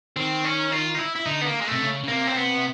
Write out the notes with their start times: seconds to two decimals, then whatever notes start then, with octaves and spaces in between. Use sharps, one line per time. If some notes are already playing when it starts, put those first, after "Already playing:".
0.16 D#3 C4
0.44 C#4
0.72 F4
0.95 D#4
0.98 E4
1.16 E4
1.26 D3 D#4
1.41 B3
1.46 A#3
1.61 G#3
1.67 C3 A3
1.81 C#3
2.04 C#3
2.08 C3 A#3
2.27 C4
2.36 B3